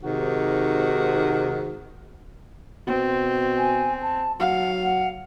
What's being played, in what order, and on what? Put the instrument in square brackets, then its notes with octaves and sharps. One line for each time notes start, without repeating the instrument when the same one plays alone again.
[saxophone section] G#2 C3 D#3 F#4
[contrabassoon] B2 [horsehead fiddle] C4
[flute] G#5
A5
[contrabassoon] F#3 [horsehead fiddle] F5 [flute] F#5
[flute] F#5